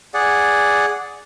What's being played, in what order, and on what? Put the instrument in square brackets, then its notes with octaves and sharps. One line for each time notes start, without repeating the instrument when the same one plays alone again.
[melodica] G#4 D5 F#5